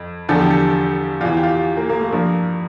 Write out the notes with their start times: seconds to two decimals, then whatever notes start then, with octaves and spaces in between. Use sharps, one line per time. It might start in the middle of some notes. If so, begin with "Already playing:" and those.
Already playing: F2
0.29 E2 D3 F3 A4
0.40 G4
0.51 A4
1.21 E2 E3 F4
1.37 G4
1.43 F4
1.77 A#3
1.90 A#3
2.01 A3
2.12 G2 F3 A#3